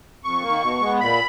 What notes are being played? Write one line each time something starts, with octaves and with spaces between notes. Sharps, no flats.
F2 C#6
A#3
D#3
B2
G#3 B3
A#2 B5